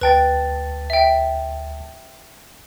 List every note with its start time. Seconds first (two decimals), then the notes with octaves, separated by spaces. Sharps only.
0.01 D2 B4 G5 A5 A6
0.90 E5 G5